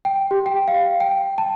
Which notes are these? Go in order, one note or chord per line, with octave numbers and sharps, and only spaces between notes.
G5
G4
G5
F5
G5
A5